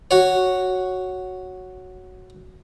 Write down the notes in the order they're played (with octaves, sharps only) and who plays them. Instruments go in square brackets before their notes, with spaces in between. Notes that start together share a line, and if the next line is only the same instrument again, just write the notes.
[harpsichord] F#4 C#5